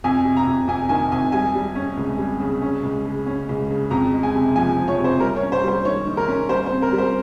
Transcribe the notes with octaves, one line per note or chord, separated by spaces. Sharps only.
F2 G#5
C3
A#5
F2
F2 G#5
D#3 G#5
F2 G#5
G3 G#5
G3
C#4
C#2
G3
C#3
C#4
C#2
C#3
C#4
C#2
C#3
F2 A#5
G#3
G#5
C3
F3 G#5
F3
C#5
C3
C5
G3 A#4
C#5
C#4
C5
G3 C5
D#3 C#5
D#3
A#4
C#4
G3 C5
C5
C4
A#4
G3
C5